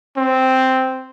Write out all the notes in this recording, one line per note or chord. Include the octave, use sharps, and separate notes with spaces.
C4